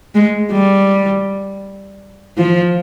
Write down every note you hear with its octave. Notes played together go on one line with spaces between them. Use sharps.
G#3
G3
F3